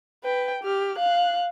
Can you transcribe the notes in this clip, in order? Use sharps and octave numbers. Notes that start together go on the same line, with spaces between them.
B4 G5
G4 F6
F5 F#6